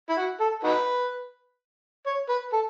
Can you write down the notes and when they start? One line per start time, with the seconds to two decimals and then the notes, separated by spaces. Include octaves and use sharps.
0.09 E4
0.17 F#4
0.40 A4
0.63 D#4 F#4 B4
2.06 C#5
2.29 B4
2.52 A4